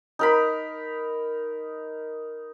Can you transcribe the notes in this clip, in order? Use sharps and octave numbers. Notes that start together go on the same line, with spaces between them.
D#4 A#4 B5